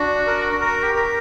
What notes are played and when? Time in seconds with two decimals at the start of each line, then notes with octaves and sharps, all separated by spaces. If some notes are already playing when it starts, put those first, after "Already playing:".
Already playing: D4 F#4
0.27 A#4
0.60 F#4 A#4
0.83 G4
0.95 A#4